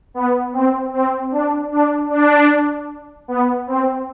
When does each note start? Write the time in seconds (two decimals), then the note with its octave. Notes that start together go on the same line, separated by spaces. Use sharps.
0.14 B3
0.53 C4
0.93 C4
1.32 D4
1.72 D4
2.10 D4
3.28 B3
3.67 C4